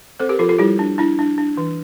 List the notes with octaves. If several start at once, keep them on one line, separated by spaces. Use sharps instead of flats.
C4 A4 C5
G4 A#4
F3 F4 A4
F4 A4
G3 E4 G4
D4
D4 E4
D4
D4
E3